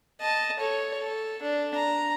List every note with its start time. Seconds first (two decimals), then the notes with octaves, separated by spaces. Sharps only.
0.21 D#5 A5
0.59 A4 C#5
0.98 A4
1.42 D4
1.76 A#5